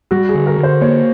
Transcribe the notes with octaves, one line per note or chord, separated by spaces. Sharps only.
G3 F#4
G#4
D3
A#4
D3
C5
A#3 C#5